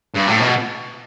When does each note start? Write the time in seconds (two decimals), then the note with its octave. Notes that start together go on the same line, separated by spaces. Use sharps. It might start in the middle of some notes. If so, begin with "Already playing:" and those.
0.14 G2
0.27 A2
0.40 B2